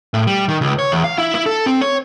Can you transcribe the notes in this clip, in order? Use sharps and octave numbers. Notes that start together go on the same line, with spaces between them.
A2
G3
D#3
C#2
C#5
E2
F5
E4
E4
A4
C4
C#5